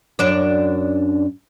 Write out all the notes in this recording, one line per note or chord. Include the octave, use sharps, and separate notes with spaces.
F#2 D4 D5